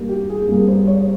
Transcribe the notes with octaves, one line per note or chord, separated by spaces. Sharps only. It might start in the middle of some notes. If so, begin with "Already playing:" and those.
Already playing: G2 G3 A#3
G4
G#4
G2 G3 A#3 G#4
C5
C#5